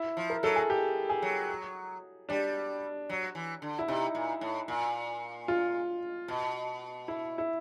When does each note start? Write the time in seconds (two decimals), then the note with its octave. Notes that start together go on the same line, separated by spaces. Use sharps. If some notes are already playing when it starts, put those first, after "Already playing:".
Already playing: E4
0.17 F3
0.30 A#4
0.43 F#3 A4
0.56 G#4
0.70 G4
1.10 G#4
1.22 F#3
2.29 G3 D4
3.09 F#3
3.35 E3
3.62 D3
3.79 E4
3.88 C3 D#4
4.15 A#2
4.41 A2
4.68 A#2
5.48 F4
6.28 B2
7.08 E4
7.38 E4